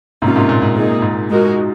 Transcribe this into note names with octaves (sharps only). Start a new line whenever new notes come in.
G#2 C3 A#3 C#4 F4
G#2 C3
A#2
G#2
A#2 A#3 D#4 G#4
G#2
G#3 D#4 F#4 A#4